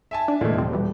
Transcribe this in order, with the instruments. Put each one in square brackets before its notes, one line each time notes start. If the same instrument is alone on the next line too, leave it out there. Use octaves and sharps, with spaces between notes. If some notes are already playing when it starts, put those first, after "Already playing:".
[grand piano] E5 G#5 A5
[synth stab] D4
[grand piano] A#2 E3 G#3 [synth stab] D3 A3
[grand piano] D#1 [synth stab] F2 C3 C4
[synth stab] B2 E3 G3